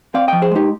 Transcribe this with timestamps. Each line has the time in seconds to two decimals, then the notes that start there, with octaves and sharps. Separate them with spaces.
0.14 C4 D5 F5
0.28 F3 D#5 G5
0.42 G#4 C5
0.51 G#3 D#4 G4